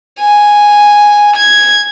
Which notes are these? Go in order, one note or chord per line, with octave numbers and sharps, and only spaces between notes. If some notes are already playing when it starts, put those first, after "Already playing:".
G#5
G#6